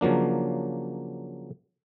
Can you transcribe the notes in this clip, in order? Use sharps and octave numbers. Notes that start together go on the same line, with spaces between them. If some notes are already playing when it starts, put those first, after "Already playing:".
C#3 F3 F#3 A#3 D4